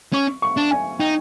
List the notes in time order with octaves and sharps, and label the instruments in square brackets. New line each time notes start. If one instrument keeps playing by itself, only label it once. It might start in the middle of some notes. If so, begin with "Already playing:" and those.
[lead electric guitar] C#4 [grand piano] C#6
[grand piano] C#6
[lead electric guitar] D4
[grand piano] G#5
[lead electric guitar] D#4 [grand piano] G5